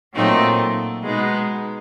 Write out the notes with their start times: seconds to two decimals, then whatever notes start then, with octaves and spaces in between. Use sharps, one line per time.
0.15 A#2 F#3 A3 C4 D#4
1.04 B2 G#3 B3 D#4